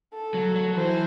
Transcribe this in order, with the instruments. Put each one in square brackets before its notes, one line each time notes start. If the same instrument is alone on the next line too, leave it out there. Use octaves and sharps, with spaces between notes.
[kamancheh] A4
[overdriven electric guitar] F#3
F#3
[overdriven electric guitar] E3 [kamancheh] C5